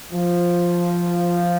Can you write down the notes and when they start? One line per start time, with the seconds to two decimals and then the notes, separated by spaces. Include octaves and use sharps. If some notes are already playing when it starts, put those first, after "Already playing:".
0.12 F3